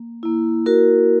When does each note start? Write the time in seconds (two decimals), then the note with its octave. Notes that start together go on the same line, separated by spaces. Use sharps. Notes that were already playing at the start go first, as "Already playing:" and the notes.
Already playing: A#3
0.23 A#3 E4
0.66 F#4 A#4